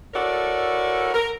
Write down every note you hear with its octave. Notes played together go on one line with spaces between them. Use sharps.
E4 F#4 A4 A#4 C#5 D5
A#4